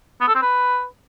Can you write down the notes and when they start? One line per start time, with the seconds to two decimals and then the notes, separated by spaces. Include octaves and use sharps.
0.21 B3
0.28 A4
0.35 C4
0.42 B4